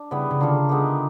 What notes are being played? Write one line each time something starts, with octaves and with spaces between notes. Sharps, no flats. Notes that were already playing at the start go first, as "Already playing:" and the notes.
Already playing: D4
C#3 G3 B3 E4
C#3
D3 A#3 D4 F4 A4
G#3 B3 D#4 G4